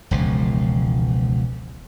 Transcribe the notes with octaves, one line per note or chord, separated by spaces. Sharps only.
E1 C#2 F3